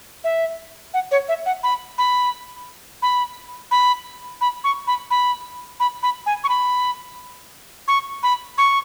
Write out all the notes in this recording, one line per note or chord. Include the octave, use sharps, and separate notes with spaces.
E5
F#5
C#5
E5
F#5
B5
B5
B5
B5
B5
C#6
B5
B5
B5
B5
G#5
C#6
B5
C#6
B5
C#6